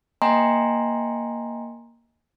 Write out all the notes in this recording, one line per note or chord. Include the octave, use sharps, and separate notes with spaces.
A#3 D#5 G5 G#5 A#5 C6